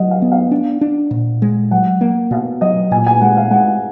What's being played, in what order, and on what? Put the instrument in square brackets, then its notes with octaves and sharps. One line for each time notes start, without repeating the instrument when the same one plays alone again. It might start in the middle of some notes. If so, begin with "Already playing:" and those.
Already playing: [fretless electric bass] F#3 [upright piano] D#5 F#5
[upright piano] F5
[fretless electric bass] B3
[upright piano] F5
[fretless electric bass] D4
D4
A#2
G#3
[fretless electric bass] F#3 [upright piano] F#5
[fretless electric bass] A#3
[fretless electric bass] B2 [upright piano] F5
[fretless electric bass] F#3 [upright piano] D#5
[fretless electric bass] A#2 [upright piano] G#5
[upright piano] G#5
[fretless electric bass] G#3 [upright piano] F#5
[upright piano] F5
[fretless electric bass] G#3 [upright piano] F#5